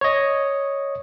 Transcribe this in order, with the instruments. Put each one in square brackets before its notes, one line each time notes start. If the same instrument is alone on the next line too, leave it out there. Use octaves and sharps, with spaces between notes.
[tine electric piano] C#5 D#5